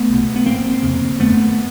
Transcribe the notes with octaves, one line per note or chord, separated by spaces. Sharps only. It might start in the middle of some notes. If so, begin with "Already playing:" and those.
Already playing: A3 B3
C2 B2
B3
A#1 G#2 A#3 C4
F1 F2 C#3
G1 F#2 D3 A3 B3